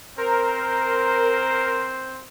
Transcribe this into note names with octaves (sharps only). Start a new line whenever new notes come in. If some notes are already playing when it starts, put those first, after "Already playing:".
C4 A#4 C5